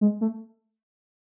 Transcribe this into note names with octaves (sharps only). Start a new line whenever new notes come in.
G#3
A3